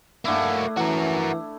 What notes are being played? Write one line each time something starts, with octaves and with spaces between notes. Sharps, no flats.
A3 A#3 D4 E4 F#4
E3 F#4 A#4